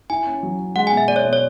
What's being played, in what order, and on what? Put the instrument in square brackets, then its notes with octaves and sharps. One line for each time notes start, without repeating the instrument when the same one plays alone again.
[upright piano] E4 [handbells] G#5
[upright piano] C#4
F#3
C#4
[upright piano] G#3 [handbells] F#5
[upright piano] B2 [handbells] G#5
[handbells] E5
[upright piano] B2 [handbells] D5
[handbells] C#5
[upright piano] B2
[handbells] C#5